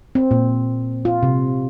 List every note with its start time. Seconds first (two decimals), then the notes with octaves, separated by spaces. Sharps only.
0.15 C4
0.31 A#2
1.05 F4
1.23 C3